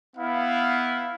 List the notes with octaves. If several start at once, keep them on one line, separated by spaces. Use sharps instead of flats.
B3 E4 F5